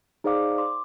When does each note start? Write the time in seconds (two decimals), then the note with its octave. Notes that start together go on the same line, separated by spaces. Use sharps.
0.24 D#4 G#4 C5 D5 F5 D6
0.58 C6 D6